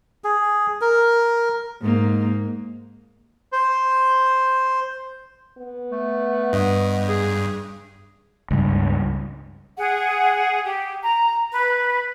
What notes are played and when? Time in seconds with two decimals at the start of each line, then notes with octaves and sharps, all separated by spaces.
0.24 G#4
0.81 A#4
1.82 G#2 A#3
3.52 C5
5.58 B3
5.91 A3
6.53 G2 D#5
7.08 G#4
8.51 C#2 G2
9.78 G#4 F#5
10.64 G4
11.03 A#5
11.52 B4